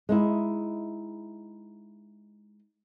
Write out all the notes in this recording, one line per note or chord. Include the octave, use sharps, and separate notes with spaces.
G#3 D#4 E4